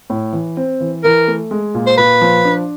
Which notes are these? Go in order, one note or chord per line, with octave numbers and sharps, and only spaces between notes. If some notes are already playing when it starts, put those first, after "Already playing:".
A2
E3
C4
E3
E3 A#4
A3
G#3
A#2
C5
A#2 B4
F3
D4